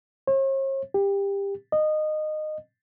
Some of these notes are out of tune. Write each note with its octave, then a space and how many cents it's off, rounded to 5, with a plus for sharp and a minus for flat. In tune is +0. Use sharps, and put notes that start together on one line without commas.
C#5 -45
G4 +20
D#5 -20